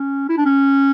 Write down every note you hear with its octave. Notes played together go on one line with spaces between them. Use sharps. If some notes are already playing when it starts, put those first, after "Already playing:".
Already playing: C#4
E4
D4
C#4